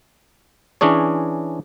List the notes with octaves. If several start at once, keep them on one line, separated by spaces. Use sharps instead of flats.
E3 C#4 D4 G#4 C#5